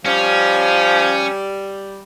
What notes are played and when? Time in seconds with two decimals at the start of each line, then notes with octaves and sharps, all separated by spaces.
0.05 F3 G3 C#4